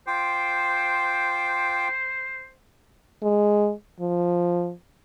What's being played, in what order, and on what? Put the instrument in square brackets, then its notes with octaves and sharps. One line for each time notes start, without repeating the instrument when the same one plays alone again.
[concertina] F4 G5 D6 [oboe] C5
[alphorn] G#3
F3